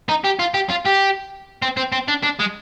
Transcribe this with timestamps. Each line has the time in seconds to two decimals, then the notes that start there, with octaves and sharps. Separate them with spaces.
0.09 D#4
0.24 G4
0.40 F4
0.54 G4
0.69 F4
0.85 G4
1.62 C4
1.77 C4
1.92 C4
2.08 D4
2.23 D4
2.39 G#3